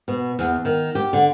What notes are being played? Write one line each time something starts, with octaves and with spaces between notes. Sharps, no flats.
B2
E2
D#3
G4
D3